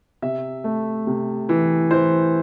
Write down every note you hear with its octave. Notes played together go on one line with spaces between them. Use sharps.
C3 E5
A3
C3
E3
E3 C5